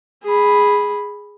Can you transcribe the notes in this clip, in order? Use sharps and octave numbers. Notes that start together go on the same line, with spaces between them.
G#4 B5